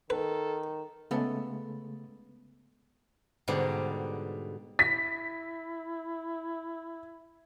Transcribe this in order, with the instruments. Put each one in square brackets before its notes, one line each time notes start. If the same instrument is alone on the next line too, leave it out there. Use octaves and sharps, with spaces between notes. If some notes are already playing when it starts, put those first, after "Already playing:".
[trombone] D#3 [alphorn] A4 [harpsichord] B4
[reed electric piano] C#3 G#3 A3 [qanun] B3 A4
[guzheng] G#2 B2 D3 G3
[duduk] E4 [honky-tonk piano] B6